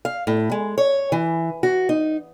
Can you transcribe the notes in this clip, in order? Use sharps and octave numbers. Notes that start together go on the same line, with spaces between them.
F5
A2
G#3
C#5
E3
F#4
D#4